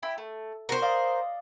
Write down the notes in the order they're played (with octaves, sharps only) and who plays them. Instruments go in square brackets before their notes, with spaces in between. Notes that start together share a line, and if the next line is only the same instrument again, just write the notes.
[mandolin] E4 G4 B5
A3
[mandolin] F#4 [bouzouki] A#4 C5
[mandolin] D5 D#5 F5